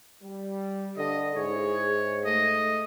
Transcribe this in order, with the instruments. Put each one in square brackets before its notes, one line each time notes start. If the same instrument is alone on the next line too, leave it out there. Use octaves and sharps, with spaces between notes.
[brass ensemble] G3
[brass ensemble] G2 [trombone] D3 [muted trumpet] D#5
[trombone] G#2 [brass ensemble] E4 G#4 [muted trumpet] C#5
[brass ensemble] A3 [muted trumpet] D#5